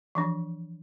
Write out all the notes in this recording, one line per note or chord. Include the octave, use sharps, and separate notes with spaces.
E3 F3 D4